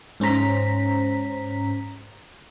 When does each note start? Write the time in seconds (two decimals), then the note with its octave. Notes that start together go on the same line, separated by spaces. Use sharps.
0.20 G#2 C#4 C5 A#5 B6